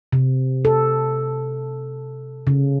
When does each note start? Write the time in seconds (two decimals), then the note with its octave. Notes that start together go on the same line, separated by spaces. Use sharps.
0.13 C3
0.65 A4
2.47 C#3